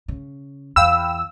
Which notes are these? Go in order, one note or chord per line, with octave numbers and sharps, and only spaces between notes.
C#3
E2 F5 G5 B5 E6